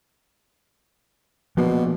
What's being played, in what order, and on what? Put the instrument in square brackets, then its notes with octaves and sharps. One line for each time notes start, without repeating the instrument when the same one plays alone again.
[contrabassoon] B2 [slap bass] F3 A#3